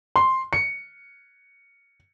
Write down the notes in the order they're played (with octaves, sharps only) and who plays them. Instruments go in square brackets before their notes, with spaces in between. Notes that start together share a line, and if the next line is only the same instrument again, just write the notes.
[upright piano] C6
C#7